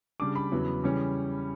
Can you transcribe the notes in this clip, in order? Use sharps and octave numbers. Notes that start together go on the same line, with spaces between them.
C#3 G3 D4 D6
B5
E2 C#3 F#3 B3 E4
C#3 E3 G3 C#4